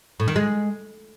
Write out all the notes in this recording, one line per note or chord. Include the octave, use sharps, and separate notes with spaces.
A2
D#3
G#3